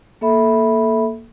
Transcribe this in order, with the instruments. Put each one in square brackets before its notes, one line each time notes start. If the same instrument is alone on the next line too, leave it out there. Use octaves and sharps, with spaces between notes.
[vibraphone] A#3 A4 E5 B5